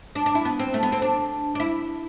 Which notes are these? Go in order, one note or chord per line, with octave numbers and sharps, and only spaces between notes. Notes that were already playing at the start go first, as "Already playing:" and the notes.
D4
D4
E4
B3
C4
A3
B3
C4
D4
D4
E4